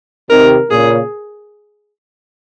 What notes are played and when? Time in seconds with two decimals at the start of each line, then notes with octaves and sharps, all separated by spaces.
0.30 C3 D#3 A#4
0.71 A#2 C#3 G#4